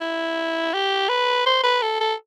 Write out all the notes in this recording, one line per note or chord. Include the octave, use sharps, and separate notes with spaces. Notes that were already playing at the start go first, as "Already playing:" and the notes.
E4
G4
B4
C5
B4
A4
A4